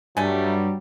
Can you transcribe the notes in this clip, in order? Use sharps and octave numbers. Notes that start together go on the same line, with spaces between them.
G2 F#3 G3 A3 G#5